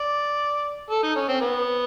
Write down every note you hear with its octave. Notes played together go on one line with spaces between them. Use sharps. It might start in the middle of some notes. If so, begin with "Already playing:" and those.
Already playing: D5
A4
D#4
C#4
C4
B3